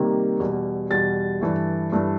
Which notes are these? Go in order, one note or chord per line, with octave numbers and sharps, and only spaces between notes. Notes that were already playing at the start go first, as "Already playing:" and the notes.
Already playing: C3 D#3 G3 A#3
E2 B2 G3
E2 B2 G3 A6
G2 E3 A3
G2 E3 A3